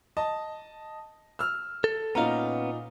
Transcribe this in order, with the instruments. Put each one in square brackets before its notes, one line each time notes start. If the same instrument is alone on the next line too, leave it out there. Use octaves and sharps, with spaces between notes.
[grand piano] D#5 A5
E6 F6
[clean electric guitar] A4
[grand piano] A#2 D#4 A#5 [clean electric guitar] B3 C#4 F5